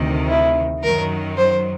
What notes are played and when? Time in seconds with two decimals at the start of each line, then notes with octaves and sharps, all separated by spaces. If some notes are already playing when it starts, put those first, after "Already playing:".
Already playing: D2 C3 D#3
0.29 E4
0.84 F#2 D#3 F#3 A#4
1.37 C5